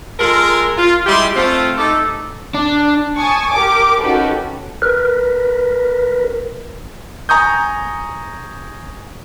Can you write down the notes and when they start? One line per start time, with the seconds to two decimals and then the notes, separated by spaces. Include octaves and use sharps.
0.20 G#3 F4 A4 A#4
0.78 F4
1.07 G3 G#3 E4 G4 E5 C6
1.36 A3 C4 F4
1.77 A3 D#4 G4 A4
2.54 D4
3.17 G#5 A5 C#6 D#6
3.51 G4 A#4 D6
4.01 C#4 D#4 F#4 G4 A4 B4
4.82 A#4 B4
7.29 G#5 A#5 C#6 D#6 G6